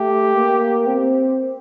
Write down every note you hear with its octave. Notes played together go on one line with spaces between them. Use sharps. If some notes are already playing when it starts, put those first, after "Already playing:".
Already playing: A3 G4
A#3
C4